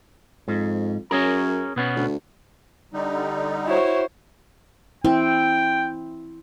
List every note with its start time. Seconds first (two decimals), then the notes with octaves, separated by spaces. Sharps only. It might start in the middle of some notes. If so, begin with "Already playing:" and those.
0.48 F2 G#2
1.11 F#2 C#4 G#4 A#4
1.76 B2 B3 C#4
1.96 D2
2.93 D3 G3 D#4
3.66 E4 F#4 C5 C#5
5.05 C4 E4 G5